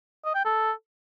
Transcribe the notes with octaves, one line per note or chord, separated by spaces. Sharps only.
D#5
G5
A4